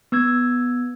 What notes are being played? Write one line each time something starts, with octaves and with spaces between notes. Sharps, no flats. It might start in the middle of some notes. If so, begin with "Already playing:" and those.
B3 E6 G#6